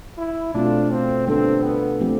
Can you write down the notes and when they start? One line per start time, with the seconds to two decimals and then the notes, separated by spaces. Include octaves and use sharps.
0.18 E4
0.54 B2 A3 C4 D4 F4
0.91 C4
1.27 D3 G3 B3 C4 D4 A4
1.64 B3
2.00 F3 A3 C4 G4